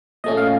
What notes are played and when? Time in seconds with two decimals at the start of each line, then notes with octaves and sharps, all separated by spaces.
0.24 A#2 A3 C#4 D#5
0.37 F5